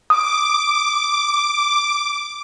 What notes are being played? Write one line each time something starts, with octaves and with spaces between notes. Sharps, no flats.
D6 D#6